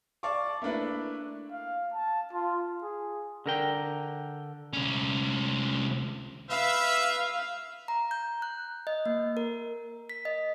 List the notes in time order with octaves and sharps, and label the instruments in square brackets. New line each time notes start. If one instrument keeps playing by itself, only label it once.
[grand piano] D5 F5 A5 C#6 D6
A3 A#3 D4 E4 B4
[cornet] F5
A5
F4
G#4
[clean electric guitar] D3 A#4 G5
[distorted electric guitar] C2 C#4
[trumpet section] B4 E5 [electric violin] F5
[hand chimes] A#5
G6
F#6
D#5
A#3
A#4
B6
D#5